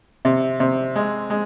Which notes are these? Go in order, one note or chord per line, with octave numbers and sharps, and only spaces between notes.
C3
C3
G#3
G#3